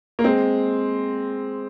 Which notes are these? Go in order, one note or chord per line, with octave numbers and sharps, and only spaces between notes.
A#3
G#3 C4